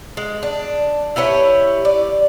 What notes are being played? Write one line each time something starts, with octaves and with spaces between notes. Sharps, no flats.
G#3
D4
E4 G4 B4 C#5
D5